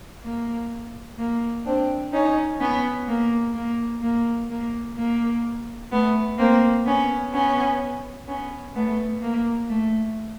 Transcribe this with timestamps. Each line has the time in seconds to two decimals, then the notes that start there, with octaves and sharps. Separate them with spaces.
0.23 A#3
1.18 A#3
1.65 C4 D4
2.13 C#4 D#4
2.59 B3 C#4
3.08 A#3
3.54 A#3
4.02 A#3
4.49 A#3
4.96 A#3
5.91 A3 B3
6.38 A#3 C4
6.85 B3 C#4
7.33 B3 C#4
8.27 B3 C#4
8.75 A3 B3
9.22 A#3
9.70 A3